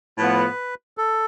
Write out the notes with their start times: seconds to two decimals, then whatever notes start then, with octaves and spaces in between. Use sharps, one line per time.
0.18 A2 F3 B3 B4
0.98 A4